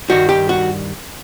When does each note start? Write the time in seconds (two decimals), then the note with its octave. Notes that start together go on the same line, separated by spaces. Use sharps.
0.10 G2 D#3 G3 F#4
0.29 G4
0.49 F#4